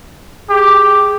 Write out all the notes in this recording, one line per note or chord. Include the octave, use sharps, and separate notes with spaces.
G4 G#4